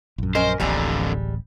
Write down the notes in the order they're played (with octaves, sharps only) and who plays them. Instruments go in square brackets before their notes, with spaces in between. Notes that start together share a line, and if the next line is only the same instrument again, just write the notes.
[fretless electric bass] A#1 F#2
[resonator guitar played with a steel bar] C#4 A#4 D#5 [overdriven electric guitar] C5
[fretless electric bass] D1 A1 [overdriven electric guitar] F2 D3 [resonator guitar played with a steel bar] G3 G#3 A#5